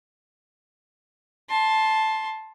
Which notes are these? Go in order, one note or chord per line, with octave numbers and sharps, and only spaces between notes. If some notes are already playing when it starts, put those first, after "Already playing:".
A5 C6